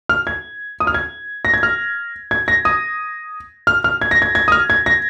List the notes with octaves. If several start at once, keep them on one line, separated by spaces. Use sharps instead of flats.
F6
G#6
D#6
F6
G#6
A#6
G#6
F6
G#6
A#6
D#6
F6
F6
G#6
A#6
G#6
G#6
D#6
F6
G#6
A#6